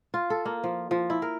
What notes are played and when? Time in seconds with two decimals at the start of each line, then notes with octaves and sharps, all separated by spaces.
0.14 F4
0.30 A4
0.45 A#3
0.64 F3
0.91 F3
1.10 E4
1.22 A#4